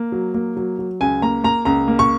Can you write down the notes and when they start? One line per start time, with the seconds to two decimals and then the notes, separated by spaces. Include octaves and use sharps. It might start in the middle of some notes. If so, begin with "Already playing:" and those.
Already playing: A#3
0.12 F#3
0.34 A#3
0.56 F#3
0.79 F#3
1.01 C#2 G#5
1.22 A#3 A#5
1.44 A#3 A#5
1.65 C#2 A#5
1.88 A#3
1.99 C#6